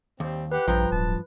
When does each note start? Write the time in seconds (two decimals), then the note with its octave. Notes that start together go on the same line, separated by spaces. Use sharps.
0.20 D#2 G3 C4
0.52 G4 B4 F#5
0.68 A#1 G2 F3 G5 A#5
0.92 D1 A5